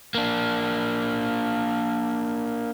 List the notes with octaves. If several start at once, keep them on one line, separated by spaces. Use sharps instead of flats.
A#3 D4